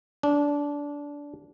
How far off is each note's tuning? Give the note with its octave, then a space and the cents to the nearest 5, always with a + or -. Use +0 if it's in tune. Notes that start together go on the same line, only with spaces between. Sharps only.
D4 -20